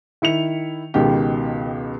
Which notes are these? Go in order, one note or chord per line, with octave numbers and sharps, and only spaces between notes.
D#3 E4 C#7 F7
C#2 B2 D#3 G4